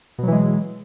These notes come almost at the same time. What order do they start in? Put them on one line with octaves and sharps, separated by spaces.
B2 F#3 E3 G#3